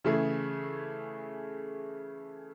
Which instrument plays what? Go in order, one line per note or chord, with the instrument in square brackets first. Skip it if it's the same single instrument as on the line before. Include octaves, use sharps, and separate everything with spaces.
[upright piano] C#3 E3 A3 G#4